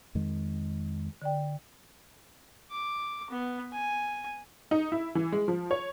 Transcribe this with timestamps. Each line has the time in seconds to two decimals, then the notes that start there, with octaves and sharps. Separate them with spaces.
0.15 F2 D#3 G#3
1.22 D3 D5 G5
2.71 D6
3.30 B3
3.72 G#5
4.71 D#4
4.92 E4
5.15 E3
5.32 G#3
5.48 F3
5.71 C#5